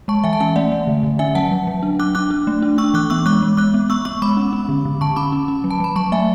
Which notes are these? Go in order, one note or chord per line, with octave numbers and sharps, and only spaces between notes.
G#3 A5 C#6
E3 E5 G#5
A5
C#4 E5 G#5
A3 D5 F#5
A3
D3
D3
C#4 E5 G#5
F#3 F#5 A5
F#3
F#3
D4
D4 D6 F#6
D4 D6 F#6
D4
A3
D4
D4 C#6 E6
E3 D6 F#6
B3 C#6 E6
G#3 D6 F#6
G#3
G#3 D6 F#6
B3
B3 C#6 E6
B3 C#6 E6
G#3 B5 D6
C#4
C#4
D3
D3
D3 A5 C#6
C#4 B5 D6
C#4
C#4
F#3
A5
F#3 B5
F#3 A5 C#6
A3 E5 G#5